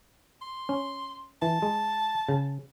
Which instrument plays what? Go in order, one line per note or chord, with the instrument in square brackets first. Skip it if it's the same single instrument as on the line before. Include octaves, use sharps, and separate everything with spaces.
[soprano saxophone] C6
[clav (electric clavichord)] C#4
[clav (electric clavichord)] E3 [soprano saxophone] A5
[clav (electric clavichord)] G#3
C#3